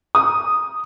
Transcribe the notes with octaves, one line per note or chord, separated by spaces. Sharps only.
D#6